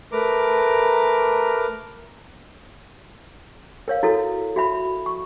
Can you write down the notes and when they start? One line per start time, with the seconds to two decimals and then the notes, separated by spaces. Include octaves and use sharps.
0.12 A3 A#4 B4 A#5 D6
3.88 A#4 C#5 F5
4.03 E4 F#4 A4
4.56 F#4 E5 B5
5.06 C#6